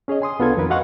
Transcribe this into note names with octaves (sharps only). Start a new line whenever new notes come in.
C#4 G#4 C#5 D#5
G#5 C6 D#6
C2 B3 D4 F4 A4 G#6
F2 D#3 C4 A#4 B4
F#4 D#5 F5 F#5 C6 C#6